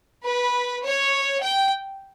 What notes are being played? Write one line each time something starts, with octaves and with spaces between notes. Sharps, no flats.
B4
C#5
G5